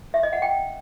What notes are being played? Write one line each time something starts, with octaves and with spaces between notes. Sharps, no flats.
E5
D#5
F#5
G5